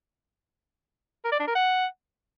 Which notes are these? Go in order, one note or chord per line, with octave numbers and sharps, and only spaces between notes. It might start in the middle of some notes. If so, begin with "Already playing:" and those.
A#4
D5
D4
A#4
F#5